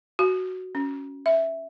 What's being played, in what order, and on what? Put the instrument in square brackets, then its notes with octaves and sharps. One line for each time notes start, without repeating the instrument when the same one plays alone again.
[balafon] F#4
C#4
E5